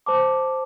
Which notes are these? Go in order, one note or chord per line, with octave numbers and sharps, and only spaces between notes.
C5 A5 D6